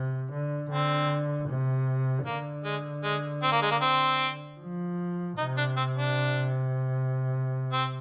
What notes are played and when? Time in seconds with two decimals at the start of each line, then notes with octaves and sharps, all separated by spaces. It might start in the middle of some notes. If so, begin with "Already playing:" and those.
Already playing: C3
0.31 D3
0.69 D3 C4
1.48 C3
2.26 D3 A#3
2.64 G#3
3.04 G#3
3.43 C4
3.52 A#3
3.62 G#3
3.71 A#3
3.82 C4
4.60 F3
5.38 C3 D#4
5.57 D4
5.77 C4
5.97 D4
7.72 C4